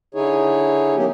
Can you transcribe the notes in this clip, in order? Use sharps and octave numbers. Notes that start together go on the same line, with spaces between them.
D3 D#4 E4 G#4 C#5
D#3 F#3 A#3 B3 C#4 G4